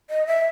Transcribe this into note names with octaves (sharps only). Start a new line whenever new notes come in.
D#5
E5